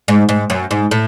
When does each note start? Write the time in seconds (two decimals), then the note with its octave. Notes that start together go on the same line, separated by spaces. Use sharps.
0.08 G#2
0.29 G#2
0.50 F#2
0.71 G#2
0.91 A2